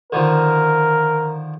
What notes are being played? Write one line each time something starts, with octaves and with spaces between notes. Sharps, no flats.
D3 D#3 F3 A#4